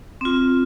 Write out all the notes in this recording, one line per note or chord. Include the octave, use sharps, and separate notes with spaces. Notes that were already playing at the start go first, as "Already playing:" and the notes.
C4 F4